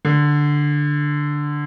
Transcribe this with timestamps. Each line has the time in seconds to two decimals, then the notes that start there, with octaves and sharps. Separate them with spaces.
0.05 D3